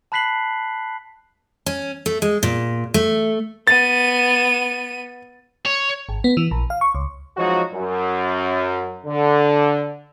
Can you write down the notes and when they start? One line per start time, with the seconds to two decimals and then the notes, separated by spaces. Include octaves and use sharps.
0.12 A5 B5 F#6 B6 C7 F#7
1.66 C#4
2.06 A3
2.22 G#3
2.43 A#2
2.94 A3
3.67 B3 A6 D#7
5.66 C#5
6.09 G#1
6.24 B3
6.37 E3
6.51 A#1
6.70 F5
6.81 C#6
6.95 C#2
7.37 F3 F#3 G#3 D#4 F#4
7.73 F#2
9.06 D3